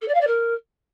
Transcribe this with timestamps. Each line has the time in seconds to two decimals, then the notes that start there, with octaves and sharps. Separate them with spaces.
0.01 A4
0.07 D5
0.14 F5
0.20 D5
0.27 A#4